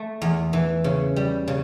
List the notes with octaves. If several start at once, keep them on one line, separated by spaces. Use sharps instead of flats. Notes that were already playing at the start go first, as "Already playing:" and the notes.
Already playing: A3
E2
E3
C#3
G3
C#3